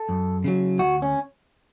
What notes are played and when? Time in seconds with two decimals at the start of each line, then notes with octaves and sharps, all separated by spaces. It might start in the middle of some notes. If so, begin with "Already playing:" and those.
Already playing: A4
0.09 F#2
0.44 C#3 F#3
0.79 D2 F#4
1.02 C#4